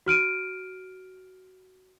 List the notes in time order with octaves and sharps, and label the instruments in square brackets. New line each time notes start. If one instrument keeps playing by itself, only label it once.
[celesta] F#4 F6 D7 D#7